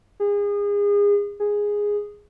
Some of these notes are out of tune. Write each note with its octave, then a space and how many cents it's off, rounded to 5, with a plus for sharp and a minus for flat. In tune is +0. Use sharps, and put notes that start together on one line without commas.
G#4 -30
G#4 -5